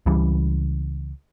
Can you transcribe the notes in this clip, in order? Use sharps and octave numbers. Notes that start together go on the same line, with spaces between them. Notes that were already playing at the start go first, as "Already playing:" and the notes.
C#2 C#3 E3 G3